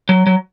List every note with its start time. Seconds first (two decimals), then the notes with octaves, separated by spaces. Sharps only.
0.09 F#3
0.27 F#3